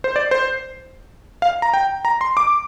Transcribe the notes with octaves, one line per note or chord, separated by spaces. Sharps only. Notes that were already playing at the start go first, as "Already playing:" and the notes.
C5
D5
C5
F5
A#5
G5
A#5
C6
D6